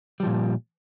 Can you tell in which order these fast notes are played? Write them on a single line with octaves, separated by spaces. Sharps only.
G3 F3 A#2